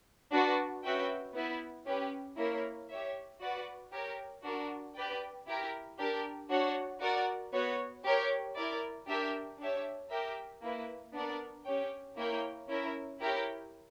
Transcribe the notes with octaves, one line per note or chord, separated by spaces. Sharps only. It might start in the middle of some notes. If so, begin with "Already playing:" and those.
D4 F#4 B4 D5
C#4 F#4 B4 E5 G5
B3 E4 B4
C#4 G4 B4
A#3 E4 A#4 C#5
G4 C#5 E5
F#4 B4 D5 F#5
G4 A#4 C#5
D4 F#4 A#4
G4 B4 D5 G5
E4 G4 A#4
D4 G4 A#4
D4 F#4 C#5 F#5
F#4 A#4 D5 F#5
B3 F#4 C#5
G4 A#4 C#5 G5
E4 A#4 D5
D4 G4 A#4 E5 G5
D4 G4 C#5 E5
G4 A#4 E5 G5
A#3 E4 B4
B3 D4 A#4 D5 F#5
C#4 G4 C#5 G5
A#3 E4 A#4 C#5 G5
C#4 E4 A#4 E5
E4 G4 A#4 C#5 G5